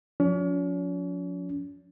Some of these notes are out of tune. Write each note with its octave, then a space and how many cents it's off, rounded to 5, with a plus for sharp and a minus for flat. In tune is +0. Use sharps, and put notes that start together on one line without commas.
F3 +40 C#4 +40